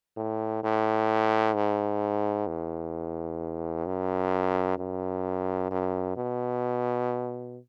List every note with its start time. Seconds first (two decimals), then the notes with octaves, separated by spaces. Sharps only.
0.17 A2
0.64 A2
1.55 G#2
2.47 E2
3.86 F#2
4.78 F#2
5.71 F#2
6.17 B2